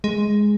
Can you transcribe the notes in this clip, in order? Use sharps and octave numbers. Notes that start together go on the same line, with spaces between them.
G#3